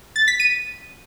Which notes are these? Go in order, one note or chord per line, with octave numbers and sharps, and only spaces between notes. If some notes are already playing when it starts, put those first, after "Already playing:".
A6
B6
D#7